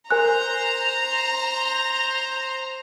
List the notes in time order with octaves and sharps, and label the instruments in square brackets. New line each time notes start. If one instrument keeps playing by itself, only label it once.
[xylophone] A#4 G#5 F#6 [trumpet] C5 [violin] A#5